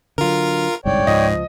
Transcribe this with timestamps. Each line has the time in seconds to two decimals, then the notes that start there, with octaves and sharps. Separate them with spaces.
0.18 D3 F#3 F4 A#4
0.85 G1 C2 G#2 C#5 D5 G5
1.07 C#2 G#2 F3 D#5